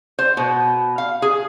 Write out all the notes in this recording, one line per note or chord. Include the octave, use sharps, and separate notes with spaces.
C5
B2
F5
G#4